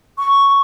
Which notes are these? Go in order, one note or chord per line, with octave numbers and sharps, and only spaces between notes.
C#6